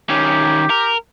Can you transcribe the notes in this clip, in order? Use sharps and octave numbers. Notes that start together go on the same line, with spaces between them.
D#3 C#4 G4
A#4